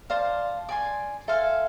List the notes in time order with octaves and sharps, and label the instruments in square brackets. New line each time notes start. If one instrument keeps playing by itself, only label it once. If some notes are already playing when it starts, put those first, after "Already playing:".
[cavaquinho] C5 F5 A5 [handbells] D5
[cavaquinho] D5 G#5 C6
[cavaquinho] A4 C5 F5 G#5 [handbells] E5